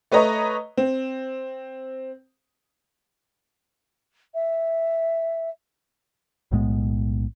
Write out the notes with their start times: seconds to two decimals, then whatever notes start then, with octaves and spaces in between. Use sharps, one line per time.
0.12 A3 B4 C#5 D#5 A#5
0.77 C4
4.34 E5
6.51 B1 A2 G#3 B3